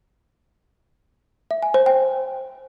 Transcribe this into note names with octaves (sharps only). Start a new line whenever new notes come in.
E5
G#5
C5
G5